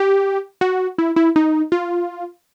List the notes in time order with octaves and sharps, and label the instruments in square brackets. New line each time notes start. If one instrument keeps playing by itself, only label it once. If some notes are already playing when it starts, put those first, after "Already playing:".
Already playing: [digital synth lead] G4
F#4
E4
E4
D#4
F4